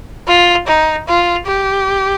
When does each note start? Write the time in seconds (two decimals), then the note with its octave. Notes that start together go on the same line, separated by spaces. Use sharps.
0.28 F4
0.68 D#4
1.08 F4
1.47 G4